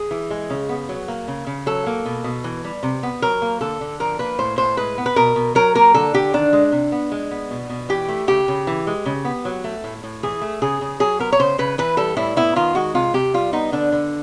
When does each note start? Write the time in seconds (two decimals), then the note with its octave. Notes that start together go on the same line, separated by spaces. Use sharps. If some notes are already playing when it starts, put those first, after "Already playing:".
Already playing: G#4
0.11 E3
0.30 G#3
0.50 C#3
0.69 B3
0.89 F#3
1.08 A#3
1.28 C#3
1.47 C#3
1.66 F#3 A4
1.87 A#3
2.05 B2
2.24 B2
2.44 E3
2.64 G3
2.83 C3
3.03 B3
3.22 F#3 A#4
3.42 A#3
3.61 D3 A4
3.81 D3
4.00 F3 A#4
4.19 A#3 B4
4.39 A2 C5
4.58 A2 C5
4.77 G#3 B4
4.98 B3
5.06 B4
5.16 B2 A#4
5.36 B2
5.55 F#3 A#4
5.75 A#3 A#4
5.94 D3 A4
6.14 D3 G4
6.33 D#3 D4
6.53 G#3
6.72 C3
6.92 B3
7.12 G#3
7.31 B3
7.51 B2
7.70 B2
7.89 E3 G4
8.09 A3
8.27 C#3 G4
8.48 C#3
8.67 E3
8.87 G#3
9.06 C#3
9.25 B3
9.45 F#3
9.64 A3
9.84 A2
10.04 A2
10.23 E3 G#4
10.42 A3
10.62 C#3 G#4
10.81 C#3
11.00 F#3 G#4
11.19 B3 A#4
11.32 C#5
11.39 C#3 C5
11.58 C#3 B4
11.78 E3 B4
11.97 G3 A4
12.17 A2 E4
12.36 B3 E4
12.56 D#3 F4
12.75 G#3 F#4
12.94 C3 F4
13.14 C3 G4
13.34 G3 F4
13.53 B3 D#4
13.72 D3 D4
13.92 D3